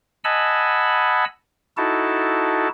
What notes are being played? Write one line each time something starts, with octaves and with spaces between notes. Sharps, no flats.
D#5 F#5 G#5 A5 B5 E6
D#4 E4 F#4 A4 A5